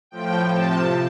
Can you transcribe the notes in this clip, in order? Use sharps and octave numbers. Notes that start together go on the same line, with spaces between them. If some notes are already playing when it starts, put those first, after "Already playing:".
A2 F3 G5
C3 F3 A5